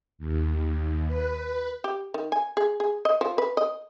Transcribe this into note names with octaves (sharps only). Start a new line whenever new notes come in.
D#2
B4
G4
D#3
G#5
G#4
G#4
D#5
F3
B4
D#5